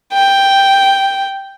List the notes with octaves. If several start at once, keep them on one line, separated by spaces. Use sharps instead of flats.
G5